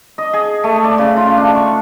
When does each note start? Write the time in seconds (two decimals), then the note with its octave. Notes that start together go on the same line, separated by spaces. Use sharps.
0.18 D#5
0.33 G#4
0.64 A3
0.84 D5
0.98 C#3
1.17 F4
1.37 D4
1.55 C#6